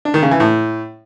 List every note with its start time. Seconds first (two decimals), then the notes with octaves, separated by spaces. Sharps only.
0.05 D4
0.14 D#3
0.23 C#3
0.31 E3
0.40 A2